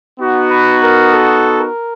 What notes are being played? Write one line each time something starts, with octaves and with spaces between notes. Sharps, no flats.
B3 D#4 F#4
B4
A#4
A4
A#4